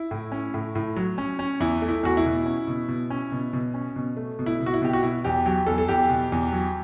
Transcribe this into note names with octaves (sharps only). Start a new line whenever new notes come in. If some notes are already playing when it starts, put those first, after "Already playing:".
Already playing: E4
A2
C#4
A2
A2
F#3
C#4
C#4
E2 E4
A3
E4
E2 F#4
E4
B2
C#4
B2
B2
C#4
B2
B2
C#4
B2
A3
B2
E4
B2
F#4
E4
B2 G4
F#4
B2 E4
E2 G4
F#3 G4
E2 A4
A4
E2 G4
B2
E2
F#3